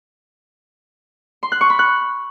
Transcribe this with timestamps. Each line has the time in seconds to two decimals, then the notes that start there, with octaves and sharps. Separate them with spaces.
1.43 C6
1.52 F#6
1.61 C#6
1.70 B5
1.79 F#6